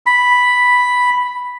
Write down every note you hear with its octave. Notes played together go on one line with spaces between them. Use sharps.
B5